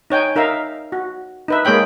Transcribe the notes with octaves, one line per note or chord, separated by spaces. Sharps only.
D#4 C#5 G5 G#5
D#4 A#4 E5 F5
F#4
D#4 B4 E5
G#3 A#3 G#4 C#5 G5 B5